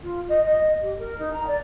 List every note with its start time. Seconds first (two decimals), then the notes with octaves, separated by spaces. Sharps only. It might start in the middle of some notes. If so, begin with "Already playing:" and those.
0.03 F4
0.29 D#5
0.45 D#5
0.82 G4
0.98 A#4
1.19 D#4
1.33 A#5
1.47 D5